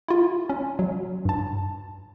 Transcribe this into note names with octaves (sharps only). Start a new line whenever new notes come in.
E4 F4
C#4
F#3
G2 A5